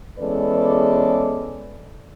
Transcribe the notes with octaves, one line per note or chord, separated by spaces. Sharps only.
E2 G#3 C#4 A4 B4 D5